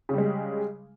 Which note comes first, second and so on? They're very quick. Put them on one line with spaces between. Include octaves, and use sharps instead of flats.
C#3 G3 G#3